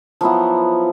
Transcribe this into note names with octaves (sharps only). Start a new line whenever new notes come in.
F3 F#3 B3 E4